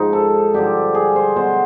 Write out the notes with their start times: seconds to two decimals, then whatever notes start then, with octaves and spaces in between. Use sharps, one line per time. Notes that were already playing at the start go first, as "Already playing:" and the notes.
Already playing: G#2 F3 D#4
0.13 A4
0.54 G2 D3 F3 G4
0.94 G#4
1.16 C5
1.36 B2 F#3 C5